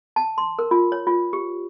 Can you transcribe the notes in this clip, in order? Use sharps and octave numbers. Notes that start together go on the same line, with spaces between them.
A5
C6
A#4
F4
C#5
F4
G4